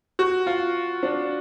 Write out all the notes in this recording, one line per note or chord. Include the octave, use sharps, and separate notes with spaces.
F#4
F4
D4